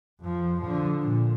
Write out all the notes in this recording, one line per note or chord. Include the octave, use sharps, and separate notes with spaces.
F2 F3
D3 F3
A#2